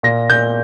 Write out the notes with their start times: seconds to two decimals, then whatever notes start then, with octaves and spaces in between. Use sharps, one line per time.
0.03 A#2 A#6
0.30 A#2 G6